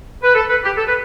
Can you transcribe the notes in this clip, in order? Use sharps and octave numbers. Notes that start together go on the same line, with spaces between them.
B4
A4
B4
G4
A4
B4